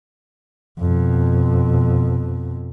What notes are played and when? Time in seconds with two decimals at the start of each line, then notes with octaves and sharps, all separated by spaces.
0.80 F2 B2